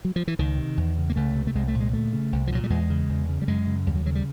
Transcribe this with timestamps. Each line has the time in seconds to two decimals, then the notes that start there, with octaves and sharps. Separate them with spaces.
0.05 F#3
0.16 F3
0.28 E3
0.39 C#2 D#3
0.58 C3
0.77 E2
0.98 C#3
1.10 A#3
1.16 C#2 A3
1.35 C3
1.47 A3
1.55 C2 G#3
1.68 A3
1.75 A#2
1.80 G#3
1.93 D2 A3
2.13 C#3
2.33 C2
2.47 F3
2.52 A#2 F#3
2.64 G3
2.70 E2 G#3
2.90 C#3
3.09 E2
3.29 C#3
3.42 G3
3.48 F#2 G#3
3.67 C#3
3.86 D#2 G3
3.96 F#3
4.06 C#3 F#3
4.15 G3